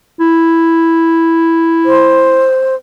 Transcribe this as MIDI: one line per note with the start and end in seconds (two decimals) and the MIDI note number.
0.20 2.48 64
1.86 2.75 72